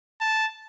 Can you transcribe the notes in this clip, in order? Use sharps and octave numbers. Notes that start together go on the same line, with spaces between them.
A5